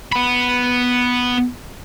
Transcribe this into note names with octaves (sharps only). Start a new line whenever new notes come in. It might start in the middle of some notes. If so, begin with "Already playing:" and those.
B3 B5